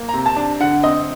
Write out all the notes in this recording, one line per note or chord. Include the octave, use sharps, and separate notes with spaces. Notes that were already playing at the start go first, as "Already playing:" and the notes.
Already playing: A#3
A#5
C3
A5
D4
D3 F#5
C4 D#5